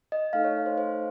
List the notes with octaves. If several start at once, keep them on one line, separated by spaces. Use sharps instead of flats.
D#5
A3 D#4 A4 F5
C#5
C5
C5